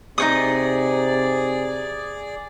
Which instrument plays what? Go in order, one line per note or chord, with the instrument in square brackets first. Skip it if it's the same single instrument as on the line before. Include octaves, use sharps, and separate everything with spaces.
[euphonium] C3 [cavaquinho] D#4 C#5 D#6 [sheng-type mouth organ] G#4 D5